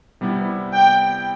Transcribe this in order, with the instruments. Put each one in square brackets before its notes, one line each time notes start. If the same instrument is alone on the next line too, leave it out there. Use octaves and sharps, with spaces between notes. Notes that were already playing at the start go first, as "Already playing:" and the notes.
[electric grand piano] C3 G3 B3 E4
[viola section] G5